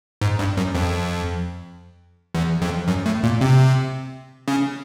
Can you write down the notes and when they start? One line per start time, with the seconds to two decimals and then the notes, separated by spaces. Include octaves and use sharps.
0.21 G#2
0.39 G2
0.57 F#2
0.75 F2
2.35 E2
2.62 F2
2.88 F#2
3.06 A2
3.23 A#2
3.41 C3
4.48 C#3